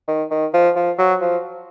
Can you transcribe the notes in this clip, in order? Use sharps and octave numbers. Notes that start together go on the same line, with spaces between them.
D#3
D#3
F3
F3
F#3
F3